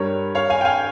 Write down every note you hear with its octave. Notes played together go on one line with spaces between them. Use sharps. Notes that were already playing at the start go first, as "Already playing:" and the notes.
Already playing: G2 G3 A#4 C#5
C#5 F5
F5 G#5
G5
F5 G#5